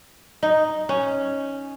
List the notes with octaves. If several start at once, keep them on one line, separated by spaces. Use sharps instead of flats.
D#4
C#4